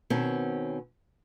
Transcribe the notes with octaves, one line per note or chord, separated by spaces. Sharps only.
B2 D#3 C4 C#4